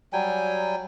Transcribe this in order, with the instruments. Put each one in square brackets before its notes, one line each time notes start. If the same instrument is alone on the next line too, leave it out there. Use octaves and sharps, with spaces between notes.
[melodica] F#3 G3 G5 G#5